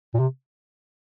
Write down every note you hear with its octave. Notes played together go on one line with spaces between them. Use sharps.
A#2
C3